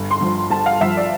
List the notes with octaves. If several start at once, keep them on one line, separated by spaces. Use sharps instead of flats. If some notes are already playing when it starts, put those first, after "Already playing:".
Already playing: G1
C6
G2 F3
G1 A5
F5
G2 F3 E5
D5